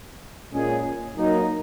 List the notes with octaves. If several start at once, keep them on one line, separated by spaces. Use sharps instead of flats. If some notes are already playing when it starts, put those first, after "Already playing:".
A#2 G#3 C#4 G#4
F#3 A#3 D#4